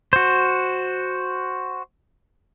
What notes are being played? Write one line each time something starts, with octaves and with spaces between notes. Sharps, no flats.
F#4 C5